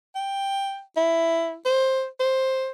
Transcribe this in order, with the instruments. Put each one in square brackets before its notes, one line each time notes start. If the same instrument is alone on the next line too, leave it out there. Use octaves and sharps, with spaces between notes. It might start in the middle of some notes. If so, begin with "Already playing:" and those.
[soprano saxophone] G5
E4
C5
C5